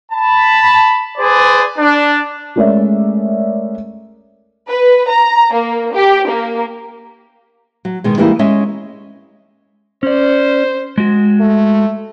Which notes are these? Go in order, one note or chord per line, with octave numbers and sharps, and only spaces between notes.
A5 B5
G#4 B4 C5 D5
D4
G#3 A3 C#4 A#4 D5 E5
B4
A#5
A#3
G4
A#3
F#3
B2 D#3 G#3
E3 G3 G#3 A#3 D#4 E4
G#3 C#4 D#5 E5
C#4 C5 D5
G#3 F#4
A3